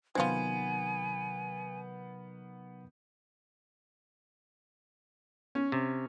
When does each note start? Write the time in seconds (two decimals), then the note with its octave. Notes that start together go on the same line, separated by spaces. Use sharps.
0.15 C3 D#3 F#3 B3 C4 F4 G#5 G#6
5.55 C#4
5.72 C3